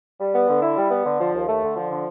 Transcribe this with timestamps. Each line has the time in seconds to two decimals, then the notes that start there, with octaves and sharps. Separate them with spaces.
0.20 G3
0.35 B3
0.49 D3
0.62 E4
0.76 G3
0.91 B3
1.05 D3
1.20 F3
1.33 D#2
1.48 A3
1.62 D3
1.77 F3
1.90 D3